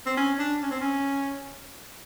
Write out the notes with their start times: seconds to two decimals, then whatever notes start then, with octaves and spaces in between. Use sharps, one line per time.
0.06 C4
0.17 C#4
0.39 D4
0.62 C#4
0.71 C4
0.80 C#4